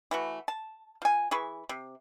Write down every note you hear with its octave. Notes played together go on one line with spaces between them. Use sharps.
E3 A3 F#4
A5
F3 G#5
E3 G#4 B4 C#6
C3